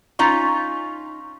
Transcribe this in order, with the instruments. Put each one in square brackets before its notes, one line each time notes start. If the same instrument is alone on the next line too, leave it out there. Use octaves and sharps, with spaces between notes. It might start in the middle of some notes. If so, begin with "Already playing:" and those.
[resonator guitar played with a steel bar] C#4 D#4 F4 [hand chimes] C#6